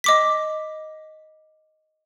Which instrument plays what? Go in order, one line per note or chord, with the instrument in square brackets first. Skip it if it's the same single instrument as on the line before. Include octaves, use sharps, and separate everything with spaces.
[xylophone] D#5 D6 B6